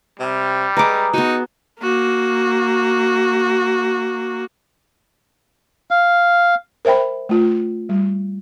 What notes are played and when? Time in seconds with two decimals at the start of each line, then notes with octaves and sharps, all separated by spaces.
0.20 C3 G3
0.77 G#3 G#4 B4 A#5 D6
1.13 B3 D#4 F#4
1.81 A#3 F#4
5.91 F5
6.85 A#4 C5 E5 G5 B5
7.29 A3 F4
7.89 G3